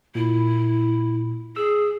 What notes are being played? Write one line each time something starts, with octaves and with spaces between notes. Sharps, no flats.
A#2 E4
G#4 E6